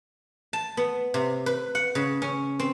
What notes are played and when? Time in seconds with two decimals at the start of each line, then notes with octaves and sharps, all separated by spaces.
0.53 A5
0.77 B3
1.14 C3
1.46 B4
1.75 F#5
1.95 C#3
2.22 C#4
2.59 C4